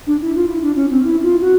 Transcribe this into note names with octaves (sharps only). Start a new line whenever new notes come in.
D4
E4
F4
E4
D4
C#4
C4
E4
F4
F#4